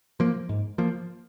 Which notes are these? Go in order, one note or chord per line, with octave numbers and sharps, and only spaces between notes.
F3 A#3
G#2
F3 A#3